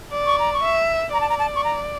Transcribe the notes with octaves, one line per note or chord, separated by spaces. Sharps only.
D5
C#6
A#5
C#6
E5
D5 A#5
A5
A#5
A5
C#6
A#5